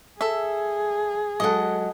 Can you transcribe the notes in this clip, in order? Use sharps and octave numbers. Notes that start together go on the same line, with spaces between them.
G#4 A4 E5
F#3 G#3 A4 D#5 F#5